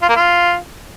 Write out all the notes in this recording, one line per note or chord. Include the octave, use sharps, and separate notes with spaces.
F4
A#3
F4